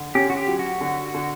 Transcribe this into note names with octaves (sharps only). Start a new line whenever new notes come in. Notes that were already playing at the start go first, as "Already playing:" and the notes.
Already playing: D3
C#4 G4
F#4
G4
F#3
F#4
D3
D3